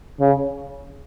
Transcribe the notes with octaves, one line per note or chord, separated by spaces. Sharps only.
C#3